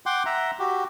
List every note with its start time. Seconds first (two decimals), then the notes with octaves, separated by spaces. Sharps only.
0.06 F#5 G5 C6 D6
0.26 E5 F#5 A#5
0.59 F#4 G4